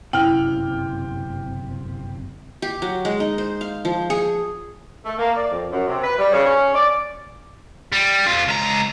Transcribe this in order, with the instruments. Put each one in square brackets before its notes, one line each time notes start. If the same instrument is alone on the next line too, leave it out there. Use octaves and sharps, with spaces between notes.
[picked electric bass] G1 F#2 C#4 [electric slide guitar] C3 [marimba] E4 [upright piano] G5 F6
[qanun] G4
F#3
G#3
D#4
C5
F5
F3
G#4
[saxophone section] A3
A#3
D5
F2
F#2
C3
B4
G3
C#3
C#4
D5
[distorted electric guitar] G3
F2 F4
C#2 A#5